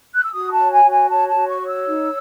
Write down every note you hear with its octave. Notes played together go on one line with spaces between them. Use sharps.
F#6
E6
F#4 D#6
A5
C#5
G#5
F#4
G#5
C#5 A5
A5
F#4
C#6
C#5
E6
D#4